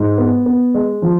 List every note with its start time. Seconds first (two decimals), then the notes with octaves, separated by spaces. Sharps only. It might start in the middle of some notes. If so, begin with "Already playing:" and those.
Already playing: G#2
0.18 B3
0.46 B3
0.74 G#3
1.02 F3